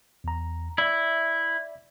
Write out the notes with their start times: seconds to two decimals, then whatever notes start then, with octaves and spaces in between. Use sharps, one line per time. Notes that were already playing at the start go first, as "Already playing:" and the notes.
0.24 E2 A#5
0.78 E4 D5 E5